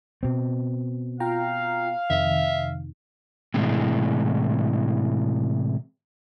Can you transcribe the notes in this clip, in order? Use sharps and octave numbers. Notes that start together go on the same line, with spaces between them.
B2 C4
F4 F5 G5 A#5
F2 C3 D#3 E5
A2 C3 E3 G#3